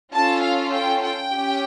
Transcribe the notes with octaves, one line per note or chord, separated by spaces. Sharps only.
C#4 F4 A4 A5
F5
G5
G5
C#4 G4